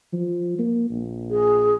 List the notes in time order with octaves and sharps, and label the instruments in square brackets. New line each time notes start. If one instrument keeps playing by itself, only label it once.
[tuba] F3
A#3
A#1
[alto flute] G#4